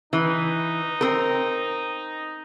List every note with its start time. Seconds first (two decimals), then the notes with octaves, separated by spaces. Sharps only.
0.13 E3 D#4
1.01 C4 A#4